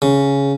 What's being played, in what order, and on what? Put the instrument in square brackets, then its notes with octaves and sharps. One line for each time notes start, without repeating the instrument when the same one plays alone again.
[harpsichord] C#3